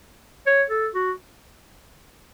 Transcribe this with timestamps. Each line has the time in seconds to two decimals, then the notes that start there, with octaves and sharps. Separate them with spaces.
0.46 C#5
0.70 A4
0.95 F#4